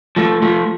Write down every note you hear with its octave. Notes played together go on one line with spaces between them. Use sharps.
F3 A3
F3 A3